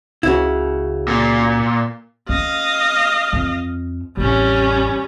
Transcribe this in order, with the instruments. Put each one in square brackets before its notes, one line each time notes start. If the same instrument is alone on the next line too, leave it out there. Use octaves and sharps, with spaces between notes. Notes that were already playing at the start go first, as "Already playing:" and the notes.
[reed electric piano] C#2 C#4 F#4 [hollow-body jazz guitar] C#3 E4
[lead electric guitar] A#2
[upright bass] C#4 [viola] D#5 F5
[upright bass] F2
[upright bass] A1 F2 [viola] G3 C#4